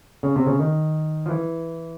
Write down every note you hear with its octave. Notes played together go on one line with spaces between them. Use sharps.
C#3
C3
C#3
D#3
F3
E3